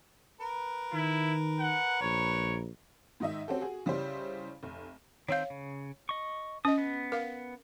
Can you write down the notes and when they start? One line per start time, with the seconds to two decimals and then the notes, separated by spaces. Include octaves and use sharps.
0.41 A#4 B4
0.93 D#3 E4
1.59 F#5
2.01 A#1 C#5
3.20 G#2 D#3 D#4 D#5 E5
3.48 C4 C#4 F#4 G4 A4
3.61 F#4 G#4
3.86 C#3 G3 C#4 E4 C5
4.63 F1
5.28 D#3 C4 C#5 F5 G6
5.50 C#3
6.09 D#5 C#6
6.65 C#4 D#5 D#6
6.78 B3
7.12 A#4 F5